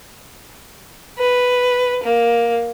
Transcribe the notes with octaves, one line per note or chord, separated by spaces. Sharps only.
B4
A#3